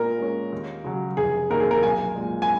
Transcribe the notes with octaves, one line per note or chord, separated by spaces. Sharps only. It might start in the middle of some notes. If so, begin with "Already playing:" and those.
Already playing: A#2 A#4
G#3 C#4
D#2
C#3 F#3
F1 G#4
D#2 D#3 A#3 A#4
G#4
A#4
B1 G#5
A#2 G#3
G#5